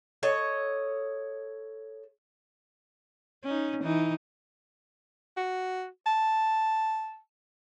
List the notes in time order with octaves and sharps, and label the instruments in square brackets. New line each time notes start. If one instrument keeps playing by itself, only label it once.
[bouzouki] A4 C#5 D#5
[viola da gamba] C#4 D#4
E3 D#4
[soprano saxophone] F#4
A5